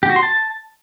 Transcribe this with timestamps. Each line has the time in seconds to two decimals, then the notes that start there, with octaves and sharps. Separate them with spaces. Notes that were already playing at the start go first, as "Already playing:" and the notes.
0.03 G4
0.09 F#4
0.16 C6
0.23 A5